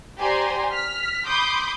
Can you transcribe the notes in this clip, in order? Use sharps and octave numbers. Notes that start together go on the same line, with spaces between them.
G4 C5 D5 G#5 A#5 C6
F6 B6
B5 C6 D6 D#6 G6